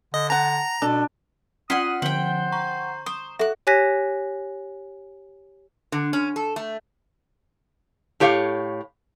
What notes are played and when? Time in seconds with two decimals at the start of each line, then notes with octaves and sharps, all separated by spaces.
0.14 D3 D#5
0.30 F#5 A5 A#5
0.82 B2 D4 A4
1.70 C#4 F4 D5 F#5 C6 D#6 F6 B6
2.02 D3 F3 C5 F#5 G5 G7
2.52 A#5 C#6
3.06 C5 D#6
3.39 F#4 A4 E5 F#6
3.67 G4 C#5 G#5 F#6 A#6 B6
5.92 D3
6.13 C#4
6.36 A4
6.56 A3
8.20 A2 G4 C#5 F5